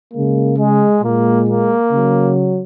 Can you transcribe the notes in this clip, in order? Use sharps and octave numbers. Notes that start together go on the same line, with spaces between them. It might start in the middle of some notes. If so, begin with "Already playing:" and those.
C#3 G#3 A#3
G#3
A#2 G#3 A#3
A#3
C#3 F#3